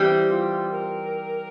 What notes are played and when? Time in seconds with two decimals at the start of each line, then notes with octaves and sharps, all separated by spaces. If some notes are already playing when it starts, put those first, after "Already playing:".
Already playing: E3 G3 C4 G4
0.29 F4
0.71 A#4